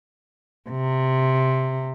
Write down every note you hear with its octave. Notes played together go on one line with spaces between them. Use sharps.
C3